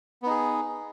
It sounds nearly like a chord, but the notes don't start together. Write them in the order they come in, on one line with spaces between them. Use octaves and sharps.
B3 D#4 G#4